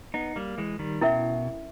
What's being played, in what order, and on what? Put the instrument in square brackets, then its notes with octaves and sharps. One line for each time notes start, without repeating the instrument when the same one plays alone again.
[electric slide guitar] B3 D#4
G3 A#3
E3 G#3
D#3 G3
[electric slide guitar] B2 [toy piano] C#4 E4 A#4 E5